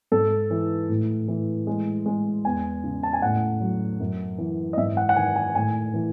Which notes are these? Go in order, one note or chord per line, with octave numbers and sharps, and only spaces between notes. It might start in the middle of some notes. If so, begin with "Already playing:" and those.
G#2 A4
E3
A2
E3
G#3
G#3
E2 G#5
C#3
A5
G#5
A2 F#5
F#3
F#2
E3
D#5
G#2 E5
F#5
F#5
D#3 G#5
G#5
A2 G#5
E3